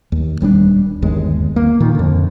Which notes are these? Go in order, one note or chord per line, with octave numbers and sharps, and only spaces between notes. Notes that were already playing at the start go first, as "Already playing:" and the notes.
D#2
D#1 G3 C4 D4
G1 D#2 G#3
A#3
A#2 D#3
F2 D3